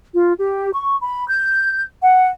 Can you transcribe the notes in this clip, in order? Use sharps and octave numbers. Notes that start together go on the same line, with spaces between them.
F4
G4
C#6
B5
G6
F#5